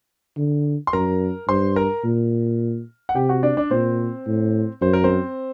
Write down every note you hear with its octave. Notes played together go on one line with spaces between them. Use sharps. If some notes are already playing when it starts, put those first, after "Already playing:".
D3
C6
F#2 A#4 A#5
G2 C5 C6
A#4 A#5
A#2
F#5
C3 G4 G5
F#4 F#5
D4 D5
D4 D5
A#2 C4 C5
A2
F#2 C5
A#4
C4 C5